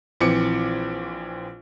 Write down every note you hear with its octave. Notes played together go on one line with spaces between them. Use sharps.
A#1 E3 C4 D6 C#7